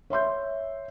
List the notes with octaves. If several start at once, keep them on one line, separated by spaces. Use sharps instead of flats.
C#5 E5 C6 G6